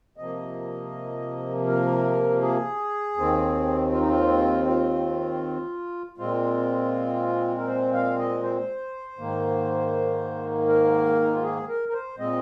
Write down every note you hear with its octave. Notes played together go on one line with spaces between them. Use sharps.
C3 F3 A#3 D#5
A#4
G#4
D#2 D#3 C4
F4
D#4
F4
F4
A#2 G#3 C4 F4
A#4
C5
F5
D#5
C5
G#2 D#3 A#3
A#4
D#4
F4
G#4
A#4
A#4
C5
A#2 G#3 C4 D#5